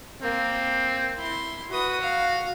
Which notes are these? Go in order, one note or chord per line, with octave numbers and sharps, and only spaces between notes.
A#3 C4
E4 C6
F#4 B4 D#6
F5